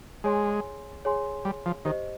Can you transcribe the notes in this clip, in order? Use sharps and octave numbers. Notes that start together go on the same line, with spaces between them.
G#3 G#4 C#5 G#5 C6
G#4 C#5 G#5 C6
G3
F3
D#3 G4 C5 D#5